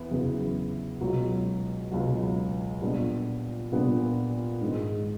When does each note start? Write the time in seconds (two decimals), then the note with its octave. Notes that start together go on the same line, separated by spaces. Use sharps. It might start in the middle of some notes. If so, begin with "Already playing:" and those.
Already playing: E2 B3
0.11 E2 C#3 F#3 B3 E4
1.01 C#2 B2 F#3
1.91 C#2 B2 F#3
2.82 A#2 G3 B3 D4
3.72 A#2 G3 B3 D4
4.61 G#2 D#3 G#3